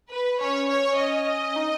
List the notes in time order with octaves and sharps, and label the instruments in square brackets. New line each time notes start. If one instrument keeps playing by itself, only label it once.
[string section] B4
[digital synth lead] C#4 [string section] C#5
[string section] C#5
D#5
[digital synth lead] D#4